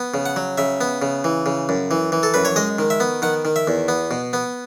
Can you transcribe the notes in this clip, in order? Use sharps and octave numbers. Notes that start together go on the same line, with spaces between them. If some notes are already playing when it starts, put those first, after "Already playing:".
Already playing: B3
C#3
F#5
F#3
C#3 E5
B3
C#3
E3
C#3
F#2
E3
E3
A4
F#2 B4
C#5
G#3 D#5
D#3
E5
B3
D#3 F#5
D#3
E5
E2
B3
B2
B3